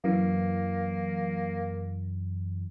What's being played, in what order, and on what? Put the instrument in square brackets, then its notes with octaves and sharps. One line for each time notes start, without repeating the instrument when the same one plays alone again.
[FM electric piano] F#2 E3 [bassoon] A#3